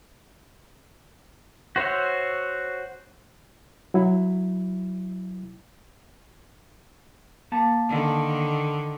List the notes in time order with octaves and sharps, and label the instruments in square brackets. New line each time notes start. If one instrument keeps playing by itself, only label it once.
[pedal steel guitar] F#4 C5 C#5 E5
[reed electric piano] F#3 E4
[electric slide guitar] A#3 A5
[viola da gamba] D3 D#3